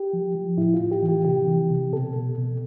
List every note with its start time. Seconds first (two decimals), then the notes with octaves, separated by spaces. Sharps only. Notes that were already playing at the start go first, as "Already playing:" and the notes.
Already playing: G4
0.13 F3
0.35 F3
0.57 A2 E4
0.74 F4
0.80 A2
0.91 G4
1.03 E3
1.08 G4
1.25 C3 G4
1.48 E3
1.70 C3
1.93 B2 A4
2.16 B2
2.38 B2